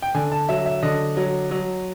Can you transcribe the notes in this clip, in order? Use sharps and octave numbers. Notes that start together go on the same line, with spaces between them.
G5
D3 G#5
A5
F#3 E5
E5
D3 D#5
F#3
F#3